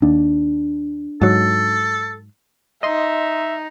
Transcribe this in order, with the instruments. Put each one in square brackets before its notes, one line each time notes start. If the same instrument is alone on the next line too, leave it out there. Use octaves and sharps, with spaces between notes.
[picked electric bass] D#2 [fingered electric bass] D4
[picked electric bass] G#2 F#3 [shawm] A4
[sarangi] D#4 [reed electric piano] D#5 C6 [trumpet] E5